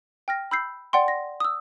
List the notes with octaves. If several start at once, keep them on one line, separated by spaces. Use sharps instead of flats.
G5 F6 A#6
B5 E6 G6 C7
D5 F#5 G5 C6
A#6
D#6 E6